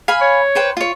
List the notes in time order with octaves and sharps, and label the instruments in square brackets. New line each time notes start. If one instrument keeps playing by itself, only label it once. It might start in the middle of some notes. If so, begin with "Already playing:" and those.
[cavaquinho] F5 G#5 B5
[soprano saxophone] C#5
[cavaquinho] B4 C5 G5
F4 C#5